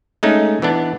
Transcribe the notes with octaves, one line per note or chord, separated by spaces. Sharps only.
G#3 A3 C#4 D#4
E3 B3 D4